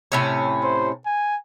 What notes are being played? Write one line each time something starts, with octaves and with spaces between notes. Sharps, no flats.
A2 C3 C#4
C5
G#5